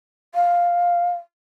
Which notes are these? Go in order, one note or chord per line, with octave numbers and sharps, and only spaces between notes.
F5